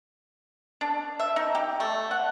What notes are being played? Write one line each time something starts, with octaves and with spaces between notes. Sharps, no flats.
D4
E5
D#4
G4
A3
F#5